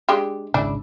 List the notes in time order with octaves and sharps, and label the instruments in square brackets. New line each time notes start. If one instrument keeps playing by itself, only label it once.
[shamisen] G#3 D4 G4
[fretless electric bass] G#1 C#2 C#3 [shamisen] D4 E4